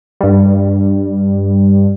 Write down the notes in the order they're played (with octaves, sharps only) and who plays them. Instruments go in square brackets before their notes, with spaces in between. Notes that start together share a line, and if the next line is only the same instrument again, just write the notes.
[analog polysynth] G2 G3